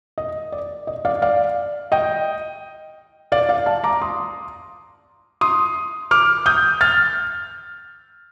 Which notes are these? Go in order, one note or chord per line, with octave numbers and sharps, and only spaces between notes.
D#5
D5
D#5
D5 F5
D5 F5
D#5 G5
D5 F5
D5 F5
F5 A5
A#5 D6
C6 D#6
C6 D#6
D6 F6
D#6 G6
F6 A6